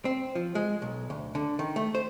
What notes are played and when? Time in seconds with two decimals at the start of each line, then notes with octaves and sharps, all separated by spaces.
0.05 C4
0.35 F3
0.55 G#3
0.82 B1
1.10 D2
1.35 D3
1.59 D#3
1.76 A3
1.95 C5